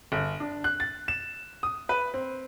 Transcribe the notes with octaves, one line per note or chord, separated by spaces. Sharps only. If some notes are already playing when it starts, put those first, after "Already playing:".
G1
D4
F#6
A6
E7
D#6
B4
C4